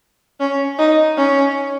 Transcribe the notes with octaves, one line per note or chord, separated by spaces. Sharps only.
C#4
D#4
C#4